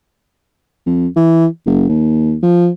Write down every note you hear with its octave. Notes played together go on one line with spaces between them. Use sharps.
F2
E3
F#1
D#2
F3